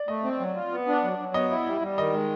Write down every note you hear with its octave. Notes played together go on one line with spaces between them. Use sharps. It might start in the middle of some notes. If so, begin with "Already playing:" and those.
Already playing: D5
A3 D#5
C4
F#3
F4
B3
D4
F#3
F#3
B3 D#5
E4
G3
G3
D#3 D#5
G#3